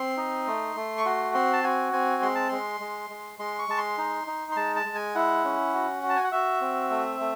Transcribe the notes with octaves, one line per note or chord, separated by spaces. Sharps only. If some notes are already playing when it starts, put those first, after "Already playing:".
Already playing: C4 C6
D#4
A3
A3
C#6
F#4 C6
C4 C6
A5
F#4 G#5
C4 G#5
G#3 C6
A5
G#3 C6
G#3
G#3
G#3 C6
C#6
G#3 A5
C6
D#4
D#4
C6
G#3 A5
A5
G#3
G#5
E4 F#5
C#4
F#4
F#4
A5
G#5
F#5
F#4 E5
C4
A3
A3